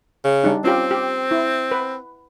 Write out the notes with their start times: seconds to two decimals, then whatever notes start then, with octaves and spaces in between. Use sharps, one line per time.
0.24 C#3
0.44 G3 D4 D#4
0.64 C4 C#4 F4 G4
0.91 G4
1.31 E4
1.71 B4